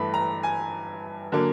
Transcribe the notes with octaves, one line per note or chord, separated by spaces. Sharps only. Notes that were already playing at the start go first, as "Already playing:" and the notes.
Already playing: G2 E3 A3 B5
A#5
G#5
D3 F#3 A#3